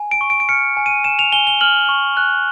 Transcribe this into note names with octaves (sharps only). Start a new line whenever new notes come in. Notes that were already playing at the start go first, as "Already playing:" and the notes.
Already playing: G#5
D7
C#6
D7
D7
F6 C#7
G#5
D#7
G#5 E7
F7
G#5 G7
G7
F6 F#7
C#6
F#6